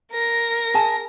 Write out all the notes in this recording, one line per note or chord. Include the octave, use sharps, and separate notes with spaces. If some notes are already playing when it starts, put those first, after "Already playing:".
A#4 A#6
G#4 G#5 A5